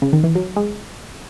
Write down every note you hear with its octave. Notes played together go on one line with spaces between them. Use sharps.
C#3
D#3
E3
F#3
G#3